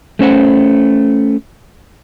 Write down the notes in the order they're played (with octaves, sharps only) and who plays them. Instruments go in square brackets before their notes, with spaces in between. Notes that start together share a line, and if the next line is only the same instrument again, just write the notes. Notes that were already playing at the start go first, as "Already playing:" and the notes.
[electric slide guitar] A3 C#4 C5 F#5